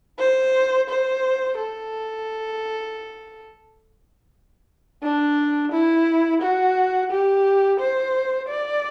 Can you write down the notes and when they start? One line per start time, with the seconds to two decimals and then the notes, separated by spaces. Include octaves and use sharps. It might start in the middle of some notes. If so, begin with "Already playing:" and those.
0.19 C5
0.89 C5
1.57 A4
5.03 D4
5.71 E4
6.41 F#4
7.11 G4
7.79 C5
8.48 D5